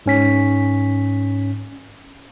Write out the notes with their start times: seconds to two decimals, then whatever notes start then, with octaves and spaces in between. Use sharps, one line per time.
0.06 G#2 C#4 B6